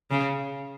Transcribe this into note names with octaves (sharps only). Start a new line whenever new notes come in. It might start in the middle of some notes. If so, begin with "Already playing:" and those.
C#3